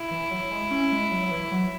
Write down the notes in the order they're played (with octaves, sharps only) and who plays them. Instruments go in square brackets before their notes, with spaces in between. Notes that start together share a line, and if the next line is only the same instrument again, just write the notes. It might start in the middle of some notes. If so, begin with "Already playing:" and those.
Already playing: [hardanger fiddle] E4
[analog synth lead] E3
F#3
G#3
C#4
G#3
F#3
F#3
E3
F#3